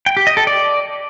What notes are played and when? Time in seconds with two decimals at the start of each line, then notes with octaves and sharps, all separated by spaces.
0.06 G5
0.17 G4
0.27 D#5
0.37 A4
0.47 D5